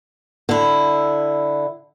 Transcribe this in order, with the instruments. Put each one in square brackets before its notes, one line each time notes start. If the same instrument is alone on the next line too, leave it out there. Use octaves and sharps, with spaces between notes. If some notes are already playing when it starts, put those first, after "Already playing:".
[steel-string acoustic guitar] D3 E4